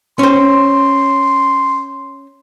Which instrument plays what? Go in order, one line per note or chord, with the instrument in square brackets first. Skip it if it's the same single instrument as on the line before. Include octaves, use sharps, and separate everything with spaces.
[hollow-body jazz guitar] C#4 C5 [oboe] C6